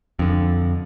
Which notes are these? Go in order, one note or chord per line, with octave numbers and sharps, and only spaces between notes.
F2 D3